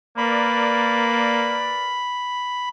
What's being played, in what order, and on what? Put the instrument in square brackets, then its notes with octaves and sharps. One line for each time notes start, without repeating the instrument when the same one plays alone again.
[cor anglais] A#3 [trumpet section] A#4 B4 D5 [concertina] B5